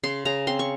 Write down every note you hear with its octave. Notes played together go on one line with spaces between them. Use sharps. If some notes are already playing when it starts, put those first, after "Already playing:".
C#3 C6
C#3 A#5
C4 C6
C#6